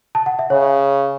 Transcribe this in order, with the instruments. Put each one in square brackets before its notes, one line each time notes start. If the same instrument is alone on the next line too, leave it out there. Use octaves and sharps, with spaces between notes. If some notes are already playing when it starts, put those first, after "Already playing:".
[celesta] A5
F#5
E5
[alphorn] C#3 [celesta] C#5